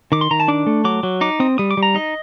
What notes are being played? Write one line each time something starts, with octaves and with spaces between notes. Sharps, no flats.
D#3 D6
C6
D#3 A#5
A5
D4 D6
A3
F#3 D6
F#3
D#4 D6
C4 D#6
G3 D#6
D6
G3
A#5
D#4 D#5